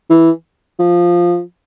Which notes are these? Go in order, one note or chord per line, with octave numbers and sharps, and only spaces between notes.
E3
F3